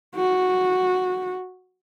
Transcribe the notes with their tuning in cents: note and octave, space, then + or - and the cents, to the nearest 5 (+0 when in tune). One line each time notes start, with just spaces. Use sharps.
F#4 -10